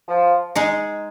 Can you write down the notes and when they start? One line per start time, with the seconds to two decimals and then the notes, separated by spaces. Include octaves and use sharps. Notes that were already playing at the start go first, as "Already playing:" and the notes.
0.08 F3
0.55 G#3 D#4 G#4